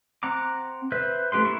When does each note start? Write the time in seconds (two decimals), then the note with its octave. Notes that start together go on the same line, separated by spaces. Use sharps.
0.23 C4 F#5 A#5 D6
0.92 B4 C5 E5
1.32 A3 C4 G4 B4 C6
1.45 A#3 E4 C#6